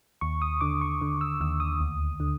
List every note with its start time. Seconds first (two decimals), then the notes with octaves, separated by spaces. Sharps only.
0.21 D#2 C#6
0.42 D#6
0.61 D3 D6
0.81 C#6
1.01 D3
1.21 E6
1.41 D#2 E6
1.60 D#6
1.80 D2
2.20 D3